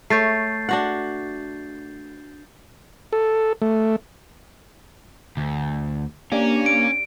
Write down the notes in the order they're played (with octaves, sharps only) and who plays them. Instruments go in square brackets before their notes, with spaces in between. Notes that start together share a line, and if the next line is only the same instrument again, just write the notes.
[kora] A3 C#5 [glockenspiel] G6 A6 C7
[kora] D4 F#4 F#5
[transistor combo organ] A4
A3
[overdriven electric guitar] D2
[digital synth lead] A#3 [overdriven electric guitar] C#4 [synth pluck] D4 G4 D5
[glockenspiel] D7